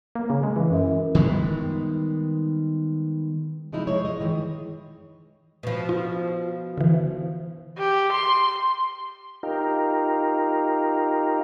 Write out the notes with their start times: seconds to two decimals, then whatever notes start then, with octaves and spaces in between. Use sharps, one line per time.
0.15 A#3
0.30 C#3
0.43 G#3
0.56 E3
0.70 F#2
1.15 D#3 G3 G#3 B3
3.72 C3 F3 G#3 D#4 E4
3.87 G#3 C#5
4.05 D#5
4.20 D#3 E3 G#3
5.63 B2 F3
5.89 F4
6.78 D3 E3
7.78 G4
8.12 C6
9.43 D#4 F4 G4 A#4